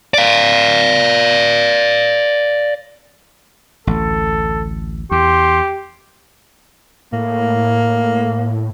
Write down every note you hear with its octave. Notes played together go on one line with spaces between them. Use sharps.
D5 F5
A1 D2 A4
E2 G4 C6
A2 A#3